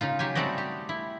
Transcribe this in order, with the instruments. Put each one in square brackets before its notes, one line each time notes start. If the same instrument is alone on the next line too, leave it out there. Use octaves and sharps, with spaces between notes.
[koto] C#3 D#4 F4
F#3 G4 G5 G#5
G3 A3 C4 F#4 D5 D#5
G4
E4